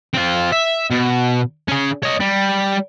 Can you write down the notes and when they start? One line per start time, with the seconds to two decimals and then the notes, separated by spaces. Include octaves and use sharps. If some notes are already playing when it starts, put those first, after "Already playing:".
0.14 C4 F4
0.52 E5
0.91 B2
1.68 C#4 G#4
2.03 C#5 D#5
2.20 G3